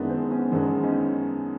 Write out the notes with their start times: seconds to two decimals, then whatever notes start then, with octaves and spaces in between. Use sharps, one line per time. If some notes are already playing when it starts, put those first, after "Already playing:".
Already playing: F#2 D#3 G#3 B3 D4 E4
0.09 C4
0.31 B3 C#4
0.52 F#2 D#3 G#3 B3 C4 D4
0.84 C#4 D#4